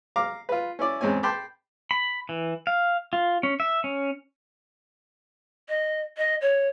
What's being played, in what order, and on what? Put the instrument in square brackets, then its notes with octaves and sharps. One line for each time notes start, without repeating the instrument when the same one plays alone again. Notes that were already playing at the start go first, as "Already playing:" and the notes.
[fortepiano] F5 A#5 D6
F4 B4
C#4 E4 D5
E2 G#2 C4 C#4 G#5
G5 A5 B5 C6 D6
[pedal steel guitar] B5
E3
F5
F4
C#4
E5
C#4
[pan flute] D#5
D#5
C#5